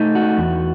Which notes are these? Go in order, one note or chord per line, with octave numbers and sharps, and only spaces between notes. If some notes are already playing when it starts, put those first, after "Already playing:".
Already playing: A3 D#4
F#4
E2